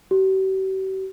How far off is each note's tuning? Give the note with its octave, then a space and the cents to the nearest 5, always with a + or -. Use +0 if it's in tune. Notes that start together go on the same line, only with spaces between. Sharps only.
G4 -45